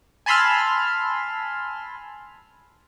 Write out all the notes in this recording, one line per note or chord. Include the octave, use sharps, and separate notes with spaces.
G#5 A5 B5 C6 E6 F6